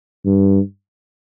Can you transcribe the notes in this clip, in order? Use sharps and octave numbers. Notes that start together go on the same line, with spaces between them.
G2